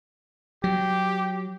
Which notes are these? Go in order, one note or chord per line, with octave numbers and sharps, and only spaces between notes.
F#3 G4